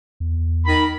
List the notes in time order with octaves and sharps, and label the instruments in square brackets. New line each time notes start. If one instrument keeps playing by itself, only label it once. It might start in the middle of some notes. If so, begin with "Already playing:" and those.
[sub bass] E2
[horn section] D#3 B5